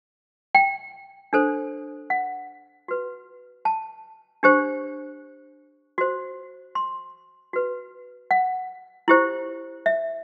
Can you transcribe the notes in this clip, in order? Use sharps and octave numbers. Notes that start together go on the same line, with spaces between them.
G5
D4 A4 C5
F#5
F#4 B4
A5
D4 G4 C5
F#4 C5
C6
F#4 B4
F#5
E4 G4 C5
E5